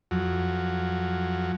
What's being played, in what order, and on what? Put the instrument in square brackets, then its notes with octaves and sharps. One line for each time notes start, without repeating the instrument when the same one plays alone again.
[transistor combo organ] F2 F#3